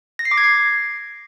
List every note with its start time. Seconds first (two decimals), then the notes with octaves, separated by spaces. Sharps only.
0.19 A#6
0.25 C7
0.31 D6
0.38 G#6
0.44 C7